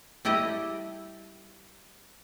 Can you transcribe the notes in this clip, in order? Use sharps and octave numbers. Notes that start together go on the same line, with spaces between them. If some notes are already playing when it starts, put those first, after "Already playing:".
G3 E4 G4 A4 D#5